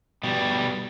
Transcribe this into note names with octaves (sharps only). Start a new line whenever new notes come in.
B2 G3